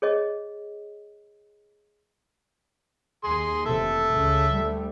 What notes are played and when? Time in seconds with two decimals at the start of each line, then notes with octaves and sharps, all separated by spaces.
0.02 G#4 C#5 D#5
3.24 D#2 G#4 C6
3.66 F1 C3 E3 A4 E5
4.14 C#2 C#3
4.54 D2 G3 A3